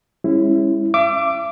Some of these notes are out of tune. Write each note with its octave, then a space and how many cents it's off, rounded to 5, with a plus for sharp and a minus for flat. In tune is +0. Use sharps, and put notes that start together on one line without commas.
G#3 -35 C#4 -25 E4 +0
E5 +40 D6 +0